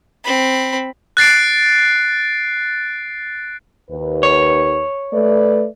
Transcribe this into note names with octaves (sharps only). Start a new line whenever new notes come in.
C4 B5
F#6 A6 C7 D7
D#2 B4
C#5
A3 B4 D5